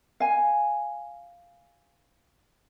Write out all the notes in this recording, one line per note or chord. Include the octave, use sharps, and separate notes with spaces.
F5 G#5